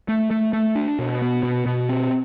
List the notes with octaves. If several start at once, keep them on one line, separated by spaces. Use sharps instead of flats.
A3
A3
A3
D4
B2
B3
B2
B2
C4